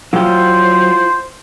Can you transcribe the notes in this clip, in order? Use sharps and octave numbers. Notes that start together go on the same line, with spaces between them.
F#3 E4 F4 C5 F#5 G5